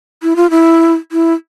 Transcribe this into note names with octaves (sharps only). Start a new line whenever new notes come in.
E4
F4
E4
E4